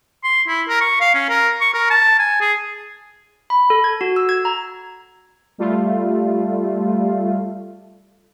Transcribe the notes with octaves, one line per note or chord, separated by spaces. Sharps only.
C6
E4
A#4
C#6
F5
C#4
A#4
C#6
A#4
A5
G#5
G#4
B5
A4
G#6
F#4
E6
G#6
A#5
G3 A3 F4